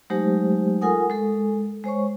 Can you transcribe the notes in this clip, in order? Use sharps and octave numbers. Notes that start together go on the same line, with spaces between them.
F#3 G#3 A3 D#4 G4 C5
F4 A4 A#4 F#5 G#5 D#6
G#3 A4
G#3 C5 C#5 C#6